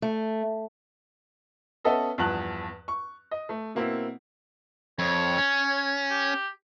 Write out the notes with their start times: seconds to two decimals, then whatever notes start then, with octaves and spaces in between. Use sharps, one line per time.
0.02 A3
1.84 B3 C#4 A4 D#5 E5
2.18 E2 G2 F3 A5 F#6 F#7
2.88 C#6
3.31 D#5
3.49 A3
3.75 B2 A#3 C4 E4
4.99 F2 C#5
5.38 C#4
6.10 G4